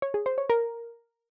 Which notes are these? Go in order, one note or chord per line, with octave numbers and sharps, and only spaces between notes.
C#5
G#4
C5
C#5
A#4